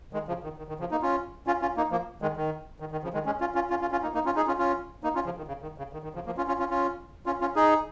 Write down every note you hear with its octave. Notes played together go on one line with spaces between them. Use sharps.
D#3 G#3
C#3 F3
D#3
D#3
D#3
C#3 F3
A#3 D#4
C#4 F4
C#4 F4
C#4 F4
A#3 D#4
F3 A#3
D#3 G#3
D#3
D#3
D#3
C#3 F3
D#3 G#3
G#3 C#4
C#4 F4
C#4 F4
C#4 F4
C#4 F4
C#4 F4
A#3 D#4
A#3 D#4
C#4 F4
D#4 G#4
C#4 F4
C#4 F4
A#3 D#4
C#4 F4
C#3 F3
D#3
C#3
D#3
C#3
D#3
D#3
C#3 F3
F3 A#3
C#4 F4
C#4 F4
C#4 F4
C#4 F4
C#4 F4
C#4 F4
D#4 G#4